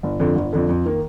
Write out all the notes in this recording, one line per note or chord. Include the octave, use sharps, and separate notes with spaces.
G1
F2 D3
G1
F2 D3
F2
D#3 A#3